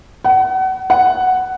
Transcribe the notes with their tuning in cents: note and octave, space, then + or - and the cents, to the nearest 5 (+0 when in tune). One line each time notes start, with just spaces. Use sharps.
F#5 +35
F#5 +5